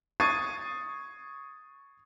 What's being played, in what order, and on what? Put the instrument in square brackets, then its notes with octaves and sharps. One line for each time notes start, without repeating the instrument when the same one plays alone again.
[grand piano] C#6 D#6 G#6 A6 C7 D#7